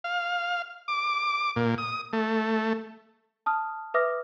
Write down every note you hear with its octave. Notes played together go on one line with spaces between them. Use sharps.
F5
D6
A#2
D#6
A3
A5 D#6 F6
B4 E5 D6 D#6 F6 A#6